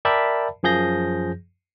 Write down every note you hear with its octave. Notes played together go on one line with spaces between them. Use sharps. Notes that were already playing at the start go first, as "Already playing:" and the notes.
A#4 D5 E5 G5 A5 B5
F#2 F3 G#4 G6 A#6